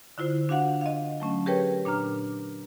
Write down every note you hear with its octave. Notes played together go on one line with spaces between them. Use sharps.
D3 E4 F4 C5
D4 F#4 F5 F#5
D#5 F5
F#3 A3 C#4
G4 G#4 A#4 B4 C#5 G5
A#2 D4 A#5 F6